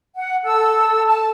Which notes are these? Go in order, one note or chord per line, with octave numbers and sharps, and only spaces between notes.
F#5
A4 E6
A5